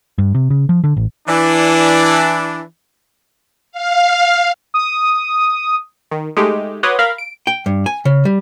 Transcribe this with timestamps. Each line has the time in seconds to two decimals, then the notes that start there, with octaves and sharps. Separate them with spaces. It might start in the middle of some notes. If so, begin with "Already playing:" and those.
0.18 G2
0.34 C3
0.50 C#3
0.69 F3
0.84 D3
0.97 A1
1.28 E3 D4
3.72 F5
4.74 D#6
6.11 D#3
6.37 G#3 A3 D#4 G4
6.83 F#4 B4 C#5 C6 D6 D#6
6.99 A#4 F5 B5 F6
7.18 D7
7.47 G5
7.66 G2
7.86 G#5
8.05 C#3
8.25 G3